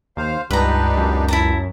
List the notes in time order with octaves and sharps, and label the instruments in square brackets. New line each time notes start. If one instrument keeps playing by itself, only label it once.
[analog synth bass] D#2 [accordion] C5 F5
[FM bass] C#2 [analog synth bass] G2 [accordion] D4 D#4 G4 [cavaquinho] B4 A#5
[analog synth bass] F#2
[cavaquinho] E4 A5 A#5